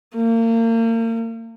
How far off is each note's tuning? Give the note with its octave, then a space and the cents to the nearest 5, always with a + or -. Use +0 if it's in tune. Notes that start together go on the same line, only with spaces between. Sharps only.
A#3 -35